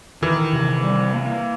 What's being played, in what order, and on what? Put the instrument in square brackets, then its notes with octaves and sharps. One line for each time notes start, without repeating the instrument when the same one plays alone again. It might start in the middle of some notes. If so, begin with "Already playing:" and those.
[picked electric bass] D#3 [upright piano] E3
[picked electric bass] C3
G3
A#3